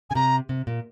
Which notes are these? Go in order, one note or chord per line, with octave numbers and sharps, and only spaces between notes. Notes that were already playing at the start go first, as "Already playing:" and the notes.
C#3 G#5
C3 A#5
C3
A#2